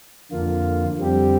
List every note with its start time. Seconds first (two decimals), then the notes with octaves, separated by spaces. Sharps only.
0.32 F2 D3 A#3 F4
0.98 F2 D3 G3 C4 G4